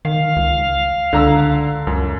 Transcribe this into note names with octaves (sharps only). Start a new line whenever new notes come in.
D#3 F5
C#2
C#2 D3 A#5 E6
C#2 F#2